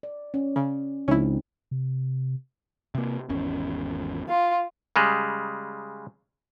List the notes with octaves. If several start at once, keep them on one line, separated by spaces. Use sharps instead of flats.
D5
C#4
C#3
C#2 F3 C4 C#4 D#4 E4
C3
C3 A#3
G#1 E2 C#4
F4
C#3 G3 G#3